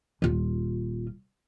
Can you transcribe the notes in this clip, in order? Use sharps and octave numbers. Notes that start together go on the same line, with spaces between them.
D#1 F4